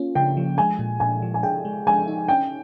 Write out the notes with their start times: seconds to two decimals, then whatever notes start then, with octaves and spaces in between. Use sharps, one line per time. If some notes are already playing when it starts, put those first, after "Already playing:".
Already playing: A#3 C#4 F4
0.15 C#3 G5
0.37 F3
0.58 G#3 G#5
0.79 A#2
1.00 A#2 G#5
1.22 F3
1.34 G#5
1.43 G#4 G5
1.65 G#3
1.87 G#3 G#5
2.08 D#4
2.28 C#4 G5